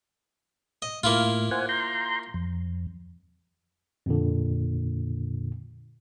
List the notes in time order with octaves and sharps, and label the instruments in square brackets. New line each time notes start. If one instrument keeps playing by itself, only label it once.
[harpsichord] D#5
[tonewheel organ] A2 [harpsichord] A#3 E4 F4
[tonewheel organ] C5 F#5 G#5
A#5 C6 G6
F2
[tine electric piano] F2 A#2 D3